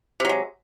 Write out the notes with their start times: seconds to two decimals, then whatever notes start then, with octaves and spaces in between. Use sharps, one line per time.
0.20 C3
0.25 F#3
0.29 G#3